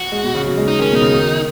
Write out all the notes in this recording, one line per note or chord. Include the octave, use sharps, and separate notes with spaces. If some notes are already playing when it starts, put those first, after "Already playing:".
Already playing: F#4
G#3
B2
C#3
F#3
G#3
G#3 D#4
D#3 C#4
B2
D#4
C#3
D#3